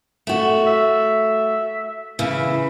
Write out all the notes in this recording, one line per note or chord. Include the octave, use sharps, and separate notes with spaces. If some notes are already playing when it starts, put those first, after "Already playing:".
A3 F#4
E5
C#3 E3 E5